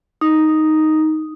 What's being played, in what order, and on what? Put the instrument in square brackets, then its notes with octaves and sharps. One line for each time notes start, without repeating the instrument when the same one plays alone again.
[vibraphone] D#4